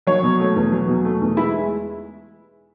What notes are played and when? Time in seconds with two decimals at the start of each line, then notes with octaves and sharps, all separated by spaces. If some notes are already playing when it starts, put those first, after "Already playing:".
0.07 F#3 C#5
0.23 B2
0.40 A3
0.55 E2
0.72 F#3
0.88 B2
1.05 A3
1.21 E2
1.37 G#3 E4